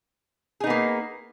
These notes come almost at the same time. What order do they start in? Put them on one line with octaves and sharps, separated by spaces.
G#4 D#4 B3 A#3